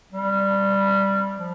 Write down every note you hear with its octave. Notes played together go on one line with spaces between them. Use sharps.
G3
F3